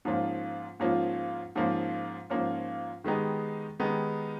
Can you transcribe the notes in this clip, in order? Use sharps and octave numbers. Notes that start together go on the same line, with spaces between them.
G#2 F3 A#3 C#4 F4
G#2 F3 A#3 C#4 F4
G#2 F3 A#3 C#4 F4
G#2 F3 A#3 C#4 F4
D#3 G#3 B3 D#4 G4
D#3 G#3 B3 D#4 G4